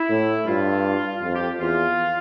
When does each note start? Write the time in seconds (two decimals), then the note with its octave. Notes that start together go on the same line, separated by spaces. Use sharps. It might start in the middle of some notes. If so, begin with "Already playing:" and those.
Already playing: E4
0.09 A2
0.47 G2 F4
1.22 F2 F4
1.35 G4
1.60 E2 F4